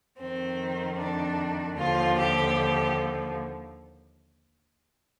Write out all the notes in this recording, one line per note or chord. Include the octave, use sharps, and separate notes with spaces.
F2 D#3 C4
D4
D#2 D3 F3 F4
G4